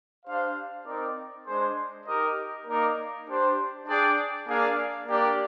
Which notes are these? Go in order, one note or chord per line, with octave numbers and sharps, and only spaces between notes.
D4 G4 C5 F5
C4 D#4 A#4 D5
G#3 D4 G#4 C5
D#4 G4 A#4 D#5
A#3 D#4 A#4 D5
D4 G4 C5
D4 G#4 D5 G5
A#3 D4 G#4 D5 F5
A#3 D4 G4 D5